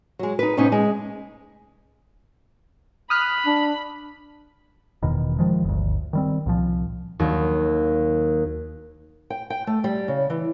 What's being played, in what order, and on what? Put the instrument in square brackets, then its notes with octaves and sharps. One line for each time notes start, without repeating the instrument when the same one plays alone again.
[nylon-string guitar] F#3 G#3
D#4 B4
A2 C3 B3 C#4 D#4
G#3
[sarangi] B5 [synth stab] D#6 F6 F#6
[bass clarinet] D4
[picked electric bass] E1 E2 B2 D#3
D#3 F3 G#3
G1 D2
D#3 G3 C4
C2 A#2 F3
[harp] D#2 F#3
[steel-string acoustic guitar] G5
G5
A3
G3
C#3
E3